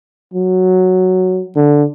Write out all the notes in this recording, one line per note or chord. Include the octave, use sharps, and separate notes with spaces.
F#3
D3